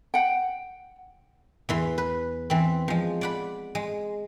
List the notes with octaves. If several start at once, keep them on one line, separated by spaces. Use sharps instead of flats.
F#5 G5
E2 E3 C6
B4
E3 C4
F3 G#3
D5 F#5 B5
G#3